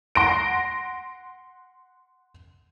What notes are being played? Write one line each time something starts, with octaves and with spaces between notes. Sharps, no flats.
F#5 C6 A#6 D7